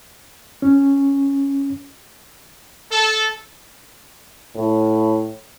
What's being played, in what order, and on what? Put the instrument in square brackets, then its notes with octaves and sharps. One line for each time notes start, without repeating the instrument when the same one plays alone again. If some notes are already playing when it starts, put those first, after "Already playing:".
[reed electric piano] C#4
[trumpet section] A4
[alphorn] A2